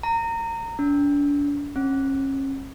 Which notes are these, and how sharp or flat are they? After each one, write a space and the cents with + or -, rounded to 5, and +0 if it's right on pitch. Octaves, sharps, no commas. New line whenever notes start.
A#5 -25
D4 -35
C#4 -35